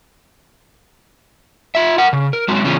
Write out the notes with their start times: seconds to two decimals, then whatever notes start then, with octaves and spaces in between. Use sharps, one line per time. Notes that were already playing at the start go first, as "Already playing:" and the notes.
1.75 F4 E5
1.98 A#4 F#5
2.13 C#3
2.33 A#4
2.48 F#3 G#3 C4 F#4
2.64 C#3 E3 B3 C#4 F4 G#4